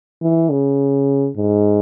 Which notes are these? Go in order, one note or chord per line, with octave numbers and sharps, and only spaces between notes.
E3
C#3
G#2